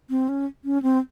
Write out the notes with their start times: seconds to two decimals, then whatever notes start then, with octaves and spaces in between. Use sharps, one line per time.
0.10 C4
0.29 C#4
0.65 C#4
0.82 C4